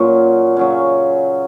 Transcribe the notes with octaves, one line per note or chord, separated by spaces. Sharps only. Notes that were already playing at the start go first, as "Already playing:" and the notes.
Already playing: A#2 F#3 C#4
C#3 F#3 C#4